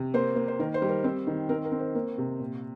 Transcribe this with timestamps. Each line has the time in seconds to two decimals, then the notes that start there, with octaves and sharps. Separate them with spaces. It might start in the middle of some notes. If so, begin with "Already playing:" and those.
Already playing: C3
0.14 A#3 C5
0.36 A#3
0.48 C5
0.59 D#3 A#4
0.74 C5
0.82 G3
0.89 A#4
1.04 C4 C5
1.27 D#3
1.49 C4 A#4
1.65 A#4
1.72 C4
1.79 C5
1.95 A#3
2.18 C3
2.40 A#2